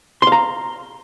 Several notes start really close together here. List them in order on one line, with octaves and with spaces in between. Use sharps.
C6 F5 A#5